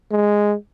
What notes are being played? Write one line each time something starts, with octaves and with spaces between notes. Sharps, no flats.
G#3